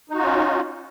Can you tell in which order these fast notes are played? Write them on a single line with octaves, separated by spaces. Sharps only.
D#4 F#4 F4 C#4